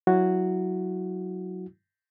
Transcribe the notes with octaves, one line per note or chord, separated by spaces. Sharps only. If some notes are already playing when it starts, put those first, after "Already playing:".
F#3 E4 F#4